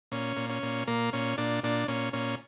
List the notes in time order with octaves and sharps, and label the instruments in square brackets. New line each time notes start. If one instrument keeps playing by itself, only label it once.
[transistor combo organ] A#2 C#4
A#2
C#4
A#2
A#2 A#3
A#2 C#4
A#2 D4
A#2 D4
A#2 C#4
A#2 C#4